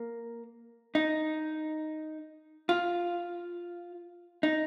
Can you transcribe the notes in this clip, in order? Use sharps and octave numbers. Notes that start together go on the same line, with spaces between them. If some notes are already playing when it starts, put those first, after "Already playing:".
Already playing: A#3
D#4
F4
D#4